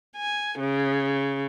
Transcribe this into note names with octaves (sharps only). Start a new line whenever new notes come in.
G#5
C#3